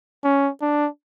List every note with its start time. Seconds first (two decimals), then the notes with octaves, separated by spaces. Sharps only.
0.24 C#4
0.62 D4